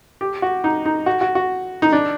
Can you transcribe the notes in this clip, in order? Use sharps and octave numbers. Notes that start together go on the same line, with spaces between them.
G4
F#4
D#4
D#4
F#4
F#4
F#4
D#4
D4